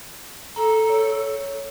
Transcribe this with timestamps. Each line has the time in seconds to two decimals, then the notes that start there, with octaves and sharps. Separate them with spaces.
0.56 A4 A#5
0.90 C#5